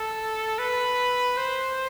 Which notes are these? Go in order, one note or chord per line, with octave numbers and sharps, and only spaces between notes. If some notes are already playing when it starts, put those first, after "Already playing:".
Already playing: A4
B4
C5